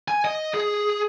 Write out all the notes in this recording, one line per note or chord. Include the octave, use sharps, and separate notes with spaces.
G#5
D#5
G#4